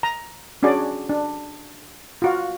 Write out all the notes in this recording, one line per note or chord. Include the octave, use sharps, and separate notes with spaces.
A#5
C#4 D4 F#4 G#4 D5
D4
F4 F#4 F5